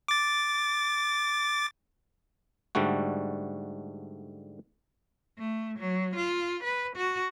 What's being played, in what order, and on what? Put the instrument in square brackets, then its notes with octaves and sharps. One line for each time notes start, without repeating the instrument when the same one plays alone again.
[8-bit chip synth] D6 A6
[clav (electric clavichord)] G#2 D3 G3 A3 F#4
[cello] A3
F#3
F4
B4
F#4